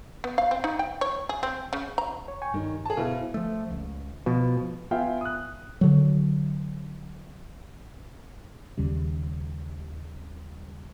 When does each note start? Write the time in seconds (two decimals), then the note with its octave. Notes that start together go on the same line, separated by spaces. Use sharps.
0.24 B3
0.38 F5
0.51 C4
0.64 D#4
0.79 G5
1.01 C#5
1.29 G#4
1.43 C4
1.73 C#3
1.98 A#5
2.28 C#5
2.42 G5 G#5 C#6
2.54 G2 D#3 G3
2.85 G#4 A5
2.97 B2 E4 C5 F5
3.34 F3 A3
3.71 C#2
4.26 B2 F3
4.91 B3 F4 E5 F5 G5 G#5
5.21 D#6 F#6
5.81 D3 F#3
8.78 D#2 C#3 G3